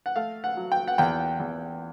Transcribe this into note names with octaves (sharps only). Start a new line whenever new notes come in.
F#5
A3 F5
F#5
F#3
G5
F#5
E2 G5
E2